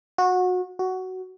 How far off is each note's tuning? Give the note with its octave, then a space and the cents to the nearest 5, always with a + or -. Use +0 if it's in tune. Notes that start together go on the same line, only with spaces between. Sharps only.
F#4 -25
F#4 +10